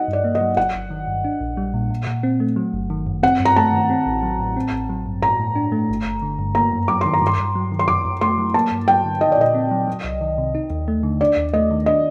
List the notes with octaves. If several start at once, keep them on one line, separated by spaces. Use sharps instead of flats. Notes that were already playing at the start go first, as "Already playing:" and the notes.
Already playing: D#4 D#5 F#5
G2
D5
A#3
D#5
F#3
G1 F#5
G1
D#3
G2
D4
A#1
G3
A#2
A#2
A#2
C4
A3
F#3
G1
D#3
F#2
C4 F#5
G2
A#5
A3 A5
D#3
C4
A1
F#3
A2
C4
A1
F#3
G2
A2 A#5
A2
D4
A3
G1
G1
D3
G2
A#3 A#5
F#2
F#3 D6
D#3 C6
A#5
G2
C6
G2
F#3
D#3
C6
F#2 D6
F#2
A3 C6
F#3
A#3 A5
G2
F#3 G5
D3
D#4 D#5
D5
A#2 D#5
C4
F#3
F#3
C2
D#3
C3
D#4
D#2
A3
D3
D4 D5
D#2
A3 D#5
D#3
D4 D#5